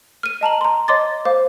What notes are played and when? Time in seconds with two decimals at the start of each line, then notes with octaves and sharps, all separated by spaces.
0.23 F6 D#7
0.41 D#5 A5 A#5 F#7
0.61 A#5 C6
0.88 C#5 D#5 C6 D6 A6
1.25 C5 F5 D6